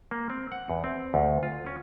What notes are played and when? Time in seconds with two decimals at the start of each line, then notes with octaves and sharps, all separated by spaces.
0.11 A#3
0.30 C4
0.52 F#5
0.70 E2
0.84 C4
1.14 D2
1.43 F4
1.66 C#4